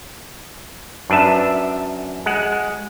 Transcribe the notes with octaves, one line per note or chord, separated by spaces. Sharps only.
F#2 D4 B4 E5 A5
G#3 F#5